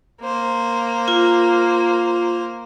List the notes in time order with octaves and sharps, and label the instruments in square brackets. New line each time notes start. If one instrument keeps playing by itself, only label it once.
[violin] A#3 C5
[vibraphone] F4